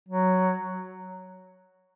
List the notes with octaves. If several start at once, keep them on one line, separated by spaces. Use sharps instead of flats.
F#3